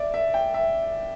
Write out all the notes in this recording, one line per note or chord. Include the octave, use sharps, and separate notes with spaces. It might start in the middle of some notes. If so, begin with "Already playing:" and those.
Already playing: D5 E5
E5
G5
E5